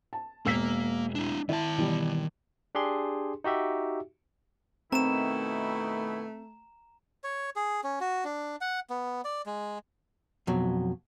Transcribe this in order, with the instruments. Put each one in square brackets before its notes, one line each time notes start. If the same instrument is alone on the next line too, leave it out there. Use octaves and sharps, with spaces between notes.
[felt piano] A5
[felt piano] E1 E6 B6 [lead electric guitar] A#3
[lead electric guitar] D4 E4
[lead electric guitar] D#3 A5 [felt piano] E4
[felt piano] B2 E3 G3
[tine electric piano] D4 G4 G#4 C6
D#4 F#4 G4 E5
[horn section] B2 D#3 E4 [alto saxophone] A3 [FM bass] C4 [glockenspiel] A#5 E7
[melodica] C#5
G#4
C#4
F#4
D4
F#5
B3
D5
G#3
[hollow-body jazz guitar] F2 B2 F#3